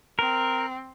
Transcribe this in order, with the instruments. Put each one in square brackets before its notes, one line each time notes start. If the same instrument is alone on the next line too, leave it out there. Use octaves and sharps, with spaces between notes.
[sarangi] C4 [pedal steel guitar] A#4